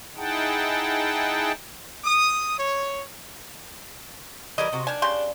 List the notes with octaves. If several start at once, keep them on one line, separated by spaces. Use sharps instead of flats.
D#4 E4 G#4 F#5 G5 A5
D#6
C#5
E3 G3 A#4 D#5
C3 F#4
D#3 D4 G#5
C#3 G4 C6